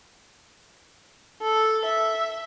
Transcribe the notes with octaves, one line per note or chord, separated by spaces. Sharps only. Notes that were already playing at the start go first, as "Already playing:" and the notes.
A4
E5